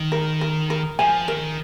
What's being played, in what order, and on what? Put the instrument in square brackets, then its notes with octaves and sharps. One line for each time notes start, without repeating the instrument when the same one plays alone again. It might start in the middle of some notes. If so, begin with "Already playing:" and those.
Already playing: [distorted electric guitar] D#3
[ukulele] A#4
A#4
A#4
[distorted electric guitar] F3 [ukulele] G#5
[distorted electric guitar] D#3 [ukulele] A#4